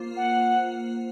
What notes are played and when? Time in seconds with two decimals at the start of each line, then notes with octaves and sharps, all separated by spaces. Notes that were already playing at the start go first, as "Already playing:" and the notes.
Already playing: A#3 F4 C5
0.17 F#5